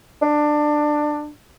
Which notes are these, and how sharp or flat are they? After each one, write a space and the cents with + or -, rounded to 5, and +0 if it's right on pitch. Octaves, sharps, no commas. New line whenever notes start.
D4 +20